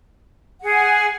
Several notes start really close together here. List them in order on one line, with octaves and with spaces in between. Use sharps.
F#5 G#4 G#5